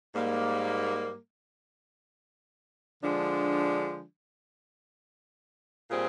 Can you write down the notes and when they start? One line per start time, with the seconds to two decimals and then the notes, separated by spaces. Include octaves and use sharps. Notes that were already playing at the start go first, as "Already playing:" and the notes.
0.15 G#2 G3 A#3
3.03 D3 F3 G#3 D4
5.91 A#2 G3 C4 F4 G#4